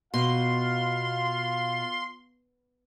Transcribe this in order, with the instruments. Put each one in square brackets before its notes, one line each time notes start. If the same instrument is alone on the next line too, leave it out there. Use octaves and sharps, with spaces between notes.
[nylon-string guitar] B2 [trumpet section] F4 F5 [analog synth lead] C6